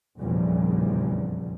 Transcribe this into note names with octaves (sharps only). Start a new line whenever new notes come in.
F1 A#1 E2 C#3 G3